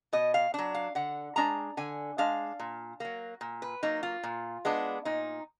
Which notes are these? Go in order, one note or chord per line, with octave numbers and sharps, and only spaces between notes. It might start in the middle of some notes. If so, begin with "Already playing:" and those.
B2 D#5
F5
F#3 D4
F5
D3 F#5
G#3 D4 A#5
D3 G#5
G#3 D4 F5
A#2
F#3 A#3
A#2
B4
F#3 A#3 D#4
F4
A#2
G#3 B3 D4
A#2 D#4